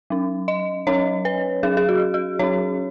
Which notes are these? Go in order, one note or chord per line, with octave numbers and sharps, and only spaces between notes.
F#3 C#4
D#5
F#3 C#4 C#5
B4
F#3 C#4 G#4
G#4
F#4
F#4
F#3 C#4 C#5